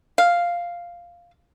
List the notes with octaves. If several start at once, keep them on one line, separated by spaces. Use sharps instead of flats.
F5